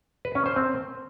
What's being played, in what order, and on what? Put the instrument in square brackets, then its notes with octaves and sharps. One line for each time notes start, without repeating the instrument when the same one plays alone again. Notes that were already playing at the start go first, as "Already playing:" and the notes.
[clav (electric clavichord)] B4
C#4
C5
C4